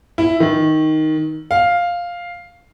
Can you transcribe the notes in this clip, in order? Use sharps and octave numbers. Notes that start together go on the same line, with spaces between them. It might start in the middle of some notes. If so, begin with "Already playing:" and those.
E4
D#3
F5